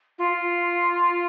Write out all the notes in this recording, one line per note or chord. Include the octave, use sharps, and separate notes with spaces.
F4